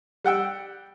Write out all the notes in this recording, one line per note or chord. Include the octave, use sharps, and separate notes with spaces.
G3 F#5 G5 E6